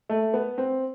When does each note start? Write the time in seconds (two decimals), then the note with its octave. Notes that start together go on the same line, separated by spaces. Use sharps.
0.09 A3
0.34 B3
0.58 C4